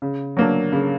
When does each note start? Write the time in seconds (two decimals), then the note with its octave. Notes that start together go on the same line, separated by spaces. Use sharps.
0.02 C#3
0.37 F#3 A#3 D4
0.72 C#3